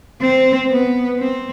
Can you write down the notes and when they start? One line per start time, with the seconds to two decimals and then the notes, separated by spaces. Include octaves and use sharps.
0.21 C4
0.70 B3
1.19 C4